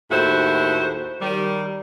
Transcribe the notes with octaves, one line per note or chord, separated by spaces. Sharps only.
D#2 A2 E4 F#4 C5
D#3 G3